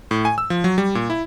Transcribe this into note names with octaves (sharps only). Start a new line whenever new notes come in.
A2
G#5
E6
F3
F#3
G3
A#2
E4